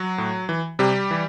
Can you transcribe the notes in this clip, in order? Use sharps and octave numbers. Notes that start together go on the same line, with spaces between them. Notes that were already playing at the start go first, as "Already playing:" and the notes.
Already playing: F#3 F#4
A2
E3
C3 G3 G4
E3